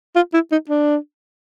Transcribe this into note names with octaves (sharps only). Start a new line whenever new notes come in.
F4
E4
D#4
D4